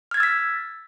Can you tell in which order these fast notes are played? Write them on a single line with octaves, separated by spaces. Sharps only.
F6 G#6 A6 E6 B6